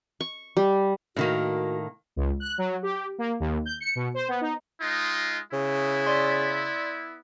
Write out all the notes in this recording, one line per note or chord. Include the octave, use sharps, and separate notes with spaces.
C#6
G3
A2 D#3 A#3 F#4
C#2
F#6
F#3
G4
A#3
D#2
G6
C#7
B2
C5
B3
D#4
G#3 D#4 F4
C#3 B3 E4
D5 C6 B6